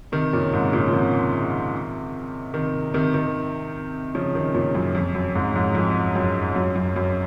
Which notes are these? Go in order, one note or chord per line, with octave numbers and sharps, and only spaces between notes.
C3 D#3
A#2 C#3
G#2 C3
A#2 C#3
F3
C3 D#3
C3 D#3
C3 D#3
C3 D#3
C#3 F3
C3 D#3
A#2 C#3
F#2
F2
F#2
F2 G#2
F2 G#2
F2
F#2
F#2
F#2
F#2